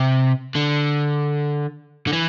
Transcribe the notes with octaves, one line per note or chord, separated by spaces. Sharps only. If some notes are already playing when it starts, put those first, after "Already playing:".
Already playing: C3
D3
D3
E3